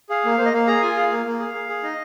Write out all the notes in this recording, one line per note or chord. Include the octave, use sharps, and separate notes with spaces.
G#4 F5
A#3
A#3 C5
D#5
A#3 F5
G#4 A#5
F5
F4 G#5
G#4 F5
A#3
A#3
G#4
G#4
G#4
D#4 D#5